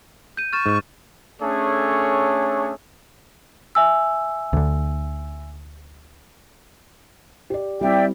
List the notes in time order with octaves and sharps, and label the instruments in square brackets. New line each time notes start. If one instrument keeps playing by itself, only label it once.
[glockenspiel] G6 D#7
[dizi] C#6 [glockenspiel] F6 A6 E7
[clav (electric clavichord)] G#2
[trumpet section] A3 C#4 D4 G#4 A4 C#5
[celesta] E5 G#5 E6
[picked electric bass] D2 D3
[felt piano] G4 D5
[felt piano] G3 C4 E4 [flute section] D5 E5 G5